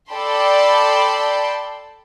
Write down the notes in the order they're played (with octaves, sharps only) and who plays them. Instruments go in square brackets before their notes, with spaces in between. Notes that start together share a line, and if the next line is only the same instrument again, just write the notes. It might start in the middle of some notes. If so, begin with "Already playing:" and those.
[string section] A4 D5 G5 A5 B5 C6